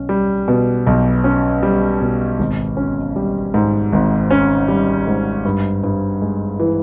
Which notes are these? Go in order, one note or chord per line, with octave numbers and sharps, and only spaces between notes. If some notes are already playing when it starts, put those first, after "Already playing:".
Already playing: B1 C#4
G3
B2
B1
C#4
G3
B2
G#1
C#4
G3
G#2
G#1
C#4
G3
G#2
G2
G2
G#3
E3